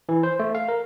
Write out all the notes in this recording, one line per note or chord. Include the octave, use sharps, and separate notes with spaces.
E3
C5
A3
F5
A#4